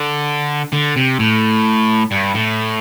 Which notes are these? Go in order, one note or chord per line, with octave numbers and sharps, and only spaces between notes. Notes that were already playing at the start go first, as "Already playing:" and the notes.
Already playing: D3
D3
C3
A2
G2
A2